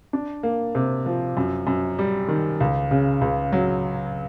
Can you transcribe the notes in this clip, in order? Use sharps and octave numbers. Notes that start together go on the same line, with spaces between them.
D4
A#3
C3
F3
F#2
F#2
G3
D#3
C#2
C#3
C#2
F#3